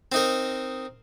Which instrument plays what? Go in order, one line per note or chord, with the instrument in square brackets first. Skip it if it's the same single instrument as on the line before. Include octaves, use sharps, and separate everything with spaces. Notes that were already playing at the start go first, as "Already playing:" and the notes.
[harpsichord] C4 D#4 A#4